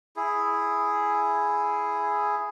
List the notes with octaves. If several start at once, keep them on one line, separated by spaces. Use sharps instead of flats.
E4 G#4